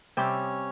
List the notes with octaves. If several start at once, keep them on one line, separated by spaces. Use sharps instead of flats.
C3 G3 C4 C#4 C#5